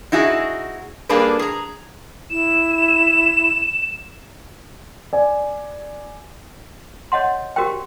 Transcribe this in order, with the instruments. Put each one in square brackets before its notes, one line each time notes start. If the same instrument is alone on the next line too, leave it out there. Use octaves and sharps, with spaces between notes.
[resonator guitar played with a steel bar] D#4 E4 F#4 G#4
G3 A#3 D4 G#4 A4 B4
G#4 A#5
[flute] E4 [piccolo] E7
[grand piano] D5 G#5
[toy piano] C#5 D#5 F#5 C6
F#4 G4 A#4 C5 G5